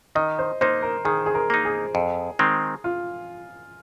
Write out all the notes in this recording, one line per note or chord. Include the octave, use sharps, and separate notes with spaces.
D#3 D#5
C5
A#3 D#4 C5
A#4
D#3 G#4
G#4
A#4
A#3 D#4
G#4
F2
D#3 G#3 C4
F4